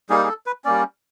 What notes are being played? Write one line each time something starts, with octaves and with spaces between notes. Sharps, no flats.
G3 A#3 D#4 G#4
G#4
A4
B4
G3 A#3 C#4 D5